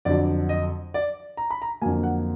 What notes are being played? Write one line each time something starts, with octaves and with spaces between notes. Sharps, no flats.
F2 D3 F#3 D5
D#5
D5
A#5
B5
A#5
F2 D3 F#3 A#3 G#5
F#5